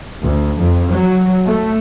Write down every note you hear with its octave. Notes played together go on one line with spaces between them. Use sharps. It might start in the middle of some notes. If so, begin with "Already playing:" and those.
D2
F2
F#3
A3